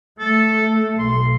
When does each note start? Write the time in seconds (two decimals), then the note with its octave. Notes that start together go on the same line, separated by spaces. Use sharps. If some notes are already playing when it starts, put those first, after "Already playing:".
0.19 A3 A4
0.99 B1 C6